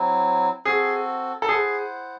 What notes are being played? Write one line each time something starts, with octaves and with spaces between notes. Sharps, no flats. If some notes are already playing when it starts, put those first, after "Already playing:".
Already playing: F#3 C4 E4
C4 F#4 G#4 A4
A4
E4 G#4 C5 F#5